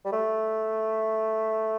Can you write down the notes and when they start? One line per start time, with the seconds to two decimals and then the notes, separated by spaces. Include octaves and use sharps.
0.05 G3
0.12 A3